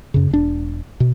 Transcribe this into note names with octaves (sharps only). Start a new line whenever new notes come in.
F#2 C#3
E1 D4
B2